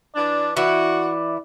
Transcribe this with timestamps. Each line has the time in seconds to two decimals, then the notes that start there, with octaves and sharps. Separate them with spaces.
0.15 E3 D4 D5
0.57 E3 E4 F#4 D5